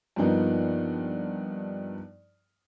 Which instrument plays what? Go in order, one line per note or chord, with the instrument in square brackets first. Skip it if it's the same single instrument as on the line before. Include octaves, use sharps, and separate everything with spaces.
[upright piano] G2 F3 A#3 B3 D#4